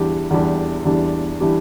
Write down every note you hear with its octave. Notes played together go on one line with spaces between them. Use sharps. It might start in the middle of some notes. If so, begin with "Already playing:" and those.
Already playing: E2 E3 G3 D4 G4
E2 E3 G3 D4 G4
E2 E3 G3 D4 G4
E3 G3 D4 G4